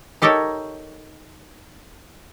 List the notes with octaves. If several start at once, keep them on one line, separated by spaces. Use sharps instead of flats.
D#4 G4 A4 A#4 C#5